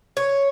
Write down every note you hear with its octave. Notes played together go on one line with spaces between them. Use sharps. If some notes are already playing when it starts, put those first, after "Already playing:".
C#5